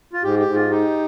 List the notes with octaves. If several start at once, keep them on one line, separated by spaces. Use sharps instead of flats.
F4
G#2 G4
G4
G#2
F4
D#4 G4